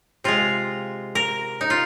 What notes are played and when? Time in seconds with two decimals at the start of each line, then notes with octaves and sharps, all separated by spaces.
0.24 C3 G#3 F4
1.15 A#4
1.61 D#4
1.70 F4